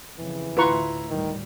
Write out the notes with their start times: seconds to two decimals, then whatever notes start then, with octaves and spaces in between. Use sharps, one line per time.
0.18 F2 C#3 E3
0.57 D2 A2 E4 F4 B4 A#5 C6 C#6
1.09 D2 A2 D#3 G3